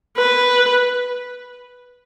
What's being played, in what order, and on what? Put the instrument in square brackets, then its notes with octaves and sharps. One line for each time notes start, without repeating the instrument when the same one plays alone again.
[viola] B4